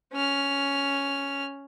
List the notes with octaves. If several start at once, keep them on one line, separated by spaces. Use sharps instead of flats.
C#4 F6